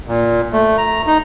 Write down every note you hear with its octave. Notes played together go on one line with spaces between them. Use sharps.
A#2
A3
A#5
D#4